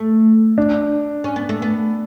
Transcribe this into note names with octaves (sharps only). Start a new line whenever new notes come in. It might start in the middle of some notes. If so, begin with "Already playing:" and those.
Already playing: A3
D4
C#4
B3
A3
B3